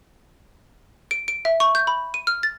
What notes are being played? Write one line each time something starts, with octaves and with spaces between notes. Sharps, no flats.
D7
D7
E5
C#6
G6
B5
D#7
F6
A6